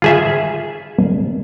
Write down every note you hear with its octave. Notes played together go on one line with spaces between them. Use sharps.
F4 G#4 E5